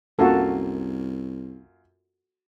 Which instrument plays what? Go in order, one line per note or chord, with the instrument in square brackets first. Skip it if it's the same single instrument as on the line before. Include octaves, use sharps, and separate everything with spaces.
[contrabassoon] C2 [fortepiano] F#2 A#3 F4 [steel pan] F#4 A4